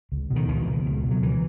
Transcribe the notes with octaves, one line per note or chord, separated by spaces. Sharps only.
C#2
B2
D#3
C#2 E3
B2
C#2
B2
F#3
E3